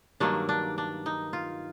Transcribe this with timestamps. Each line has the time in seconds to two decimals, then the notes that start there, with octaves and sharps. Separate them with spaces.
0.20 G2 D#3 F#3 A#3 D4
0.49 D4
0.78 D4
1.06 D#4
1.33 F4